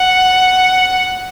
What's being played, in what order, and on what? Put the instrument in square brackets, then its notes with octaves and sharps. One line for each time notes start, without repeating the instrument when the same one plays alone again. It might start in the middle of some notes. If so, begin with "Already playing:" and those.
Already playing: [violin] F#5